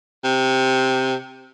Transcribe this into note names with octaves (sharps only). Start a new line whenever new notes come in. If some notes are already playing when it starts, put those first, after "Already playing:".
C3